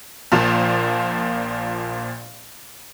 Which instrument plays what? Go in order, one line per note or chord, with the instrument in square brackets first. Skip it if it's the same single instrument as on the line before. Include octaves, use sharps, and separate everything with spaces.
[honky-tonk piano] A#1 A#2 F3